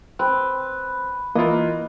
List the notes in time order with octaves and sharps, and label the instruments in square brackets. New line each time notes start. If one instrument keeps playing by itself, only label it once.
[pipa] C4 [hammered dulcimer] B4
[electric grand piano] E3 F4 [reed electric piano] A#3 [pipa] E4 D#5